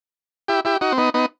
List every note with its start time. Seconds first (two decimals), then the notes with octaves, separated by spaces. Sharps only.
0.48 E4 G4
0.65 E4 G4
0.81 D#4 F#4
0.92 C4
0.98 B3 D#4
1.14 B3 D#4